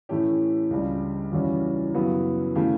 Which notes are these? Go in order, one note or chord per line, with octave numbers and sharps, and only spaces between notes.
A2 E3 A3 C#4 G4
C#2 C#3 G3 D4
E2 C#3 E3 G3 C#4 F#4
F#2 C#3 F#3 B3 E4
C#3 E3 A3 G4